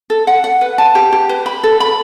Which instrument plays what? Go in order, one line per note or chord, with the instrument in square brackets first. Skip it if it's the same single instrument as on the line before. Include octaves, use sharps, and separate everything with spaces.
[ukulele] A4
F#5
F#5
B4
A5
G4
G4
B4
B5
A4
B5